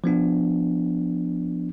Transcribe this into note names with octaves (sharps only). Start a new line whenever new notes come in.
F3 B3 D4